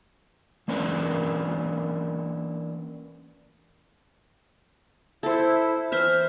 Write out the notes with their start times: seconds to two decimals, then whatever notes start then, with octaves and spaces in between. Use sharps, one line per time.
0.68 E3 A#3 C#4 D4 A#4 B4
5.23 E4 A4 C5
5.92 E3 C5 E5 F6